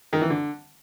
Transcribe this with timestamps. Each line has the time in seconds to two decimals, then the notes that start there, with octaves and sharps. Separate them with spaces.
0.13 D#3
0.21 E3
0.30 D3